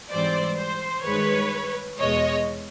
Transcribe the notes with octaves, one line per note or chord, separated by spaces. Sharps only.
G#2 E3 G3 C4 C5 D5
C5
G2 D#3 G#3 B4 C#5
E2 B2 G#3 C#5 D#5